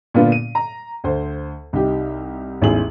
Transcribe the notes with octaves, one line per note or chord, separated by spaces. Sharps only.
A#2 D3 A#3 B3 D4 F4
D#7
A#5
D2 C5
C2 D#4 G4
A1 E2 G#2 E4 G#4 F#7